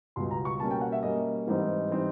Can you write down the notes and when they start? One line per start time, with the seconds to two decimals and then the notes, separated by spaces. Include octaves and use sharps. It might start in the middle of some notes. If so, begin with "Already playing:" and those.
0.16 C#2 B2 G3 C6
0.31 A#5
0.45 C#6
0.60 B2 G3 A#3 C#4 A5
0.71 G5
0.81 F#5
0.92 E5
1.03 B2 G3 A#3 C#4 D#5
1.47 G#2 E3 G3 C4 D#4
1.91 E3 G3 C4 D#4